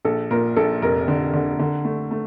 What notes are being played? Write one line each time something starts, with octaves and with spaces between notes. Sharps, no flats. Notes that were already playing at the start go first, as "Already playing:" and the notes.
A#1 A4
A#2 A#4
A#1 A4
F1 A#4
D3
D3
D3
A3
A3